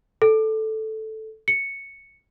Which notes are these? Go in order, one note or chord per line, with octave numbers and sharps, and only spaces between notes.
A4
C#7